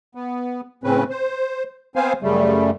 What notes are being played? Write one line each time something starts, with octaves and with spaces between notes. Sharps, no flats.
B3
A2 C#3 C4 C#4 B4
C5
B3 C4 C5 F5 G#5
F#2 C#3 G3 A3